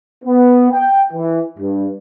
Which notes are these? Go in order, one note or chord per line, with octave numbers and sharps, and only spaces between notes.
B3
G5
E3
G2